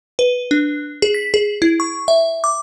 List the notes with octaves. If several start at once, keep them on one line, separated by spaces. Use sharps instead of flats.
B4
D4
G#4
B6
G#4
E4
C#6
E5
D6